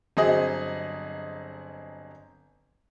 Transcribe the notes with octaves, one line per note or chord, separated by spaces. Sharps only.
G1 F#3 C4 G#4 D#5